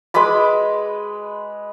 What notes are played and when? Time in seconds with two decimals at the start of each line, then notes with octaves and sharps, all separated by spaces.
0.14 G#3 B4 B5 D6